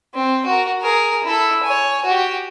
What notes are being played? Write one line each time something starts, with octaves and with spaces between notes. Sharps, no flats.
C4
F#4 A#4
G#4 A#4
E4 A4
C#5 G#5
F#4 G4